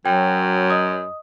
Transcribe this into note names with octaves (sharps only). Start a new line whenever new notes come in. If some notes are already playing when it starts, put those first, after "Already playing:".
F#2 F#3 G5
D#5 D#6